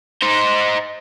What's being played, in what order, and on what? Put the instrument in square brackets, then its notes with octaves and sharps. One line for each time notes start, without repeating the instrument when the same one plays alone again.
[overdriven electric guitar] D#4 C5